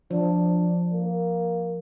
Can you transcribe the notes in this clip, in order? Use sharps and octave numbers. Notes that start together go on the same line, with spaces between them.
F3 D4
A#3